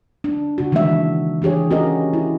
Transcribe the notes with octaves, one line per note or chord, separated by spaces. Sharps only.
D4
C#3 F#4
D#3 E3 G#3 A#3 D4 E5
E3 D4 G4 G#4 C#5
C#4 F#4 G4 A#4 D#5
E4